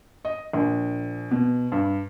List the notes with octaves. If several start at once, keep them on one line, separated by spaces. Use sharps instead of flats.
D#5
A#1
B2
G2